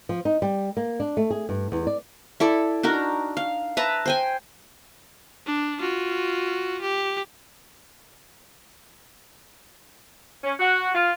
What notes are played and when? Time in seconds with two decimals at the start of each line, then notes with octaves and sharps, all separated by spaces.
0.09 F3
0.25 D#4
0.42 G3
0.77 A#3
1.00 D4
1.17 A3
1.30 G#4
1.49 G2
1.72 E2
1.87 D5
2.40 E4 A4 D5
2.83 D4 D#4 F#4 A#4
3.37 F5
3.77 B4 E5 A5 A#5
4.06 C5 G5 G#5
5.46 D4
5.81 F4 F#4
6.82 G4
10.44 C#4
10.60 F#4
10.95 F4